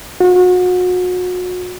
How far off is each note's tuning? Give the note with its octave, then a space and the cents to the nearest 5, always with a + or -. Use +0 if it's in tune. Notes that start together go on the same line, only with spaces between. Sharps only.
F#4 -35